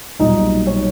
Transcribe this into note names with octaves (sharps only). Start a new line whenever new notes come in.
B1 A#2 G3 D#4 D#5
C#5